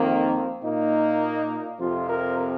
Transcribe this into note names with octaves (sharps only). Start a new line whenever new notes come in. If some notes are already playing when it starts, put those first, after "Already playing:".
Already playing: F2 D#3 A#3 C4
A#2 A#3 D#4
F2 C3 F3 F4
A#4